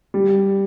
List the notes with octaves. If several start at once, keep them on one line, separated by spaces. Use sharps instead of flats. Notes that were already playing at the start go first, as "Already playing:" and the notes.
G3